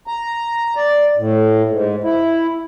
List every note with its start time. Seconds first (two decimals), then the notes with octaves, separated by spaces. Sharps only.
0.07 A#5
0.76 D5
1.17 A2
1.69 G#2
2.04 E4